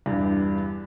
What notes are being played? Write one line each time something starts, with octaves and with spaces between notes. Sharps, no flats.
E2 G2 D4